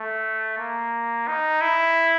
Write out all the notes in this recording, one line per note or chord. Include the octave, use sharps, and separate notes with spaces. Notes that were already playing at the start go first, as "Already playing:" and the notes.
Already playing: A3
A#3
D#4
E4